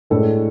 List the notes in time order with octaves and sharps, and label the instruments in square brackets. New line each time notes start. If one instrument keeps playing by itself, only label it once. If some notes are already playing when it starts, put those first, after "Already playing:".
[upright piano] A2 G#3 D4 A4